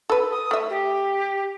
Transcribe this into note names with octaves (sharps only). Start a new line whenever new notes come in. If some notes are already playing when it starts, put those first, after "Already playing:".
A4 B4
D#6
A3 E5
G4